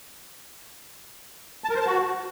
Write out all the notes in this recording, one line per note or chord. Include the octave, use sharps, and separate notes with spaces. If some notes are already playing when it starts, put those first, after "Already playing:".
A5
A#4
C5
A5
F#4